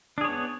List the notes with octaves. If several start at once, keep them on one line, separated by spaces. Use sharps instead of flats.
B3 D4 G#4 C#5